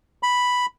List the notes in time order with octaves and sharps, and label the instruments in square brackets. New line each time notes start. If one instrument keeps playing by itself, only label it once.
[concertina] B5